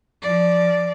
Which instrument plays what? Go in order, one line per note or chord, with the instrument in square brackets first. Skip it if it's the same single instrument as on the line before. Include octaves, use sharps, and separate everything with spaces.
[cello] F3 D5